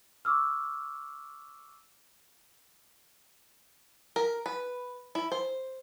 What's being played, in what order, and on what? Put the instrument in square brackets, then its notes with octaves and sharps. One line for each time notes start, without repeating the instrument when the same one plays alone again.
[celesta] C#6 D6 E6 F6
[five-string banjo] A#4
B4
E4
C5